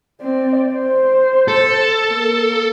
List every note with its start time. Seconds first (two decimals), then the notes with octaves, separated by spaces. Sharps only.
0.21 C4 D5
0.74 C5
1.48 A4
2.09 A#3